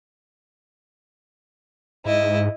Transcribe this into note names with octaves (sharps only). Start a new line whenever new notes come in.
G#2 E4 D#5